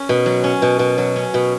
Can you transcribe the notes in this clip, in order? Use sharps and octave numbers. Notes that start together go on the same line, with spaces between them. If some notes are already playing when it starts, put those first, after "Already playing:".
Already playing: C#4
B2
F#3
C#4
B2
B2
F#3
C#4
B2